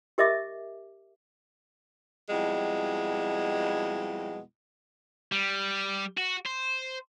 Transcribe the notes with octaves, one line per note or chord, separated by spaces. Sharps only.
G4 A#4 D#5 E5 D6
F2 B2 G3 G#3 E4
G3
F#4
C5